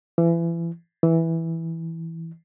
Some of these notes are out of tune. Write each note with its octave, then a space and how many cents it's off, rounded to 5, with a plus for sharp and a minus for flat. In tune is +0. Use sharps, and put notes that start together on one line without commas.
E3 +30
E3 -5